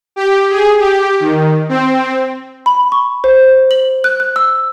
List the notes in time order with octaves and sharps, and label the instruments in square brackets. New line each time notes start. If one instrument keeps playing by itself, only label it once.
[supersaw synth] G4
G#4
G4
D#3
C4
[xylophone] B5
C#6
C5
F#7
F#6
F#6
E6